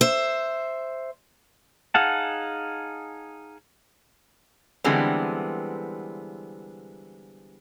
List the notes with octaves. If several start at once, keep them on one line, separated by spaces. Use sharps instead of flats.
C5 E5
D#4 G#4 F5 F#5 A5
D3 E3 G3 G#3 B3 C4